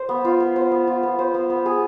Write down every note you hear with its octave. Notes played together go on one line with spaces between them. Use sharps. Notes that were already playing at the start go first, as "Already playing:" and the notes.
Already playing: C5
B3
F4
B3
C5
B3
F4
B3
C5
B3
B3
G#4